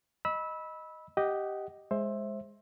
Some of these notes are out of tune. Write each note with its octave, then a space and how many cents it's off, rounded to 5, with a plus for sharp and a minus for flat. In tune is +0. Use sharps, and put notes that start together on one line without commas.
D#5 +0 B5 -15 E6 -20
G4 +0 D#5 +0 F#5 +20
G#3 +0 C5 +20 E5 +0